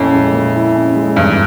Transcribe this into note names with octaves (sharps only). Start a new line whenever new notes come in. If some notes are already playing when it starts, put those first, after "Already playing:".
Already playing: F2 A#2 C#4 E4
G#3
A#2
E4
C#4
G#3
E2 G2